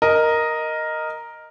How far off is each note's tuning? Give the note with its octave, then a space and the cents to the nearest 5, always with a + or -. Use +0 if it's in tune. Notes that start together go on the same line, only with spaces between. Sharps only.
A#4 +0 D#5 +0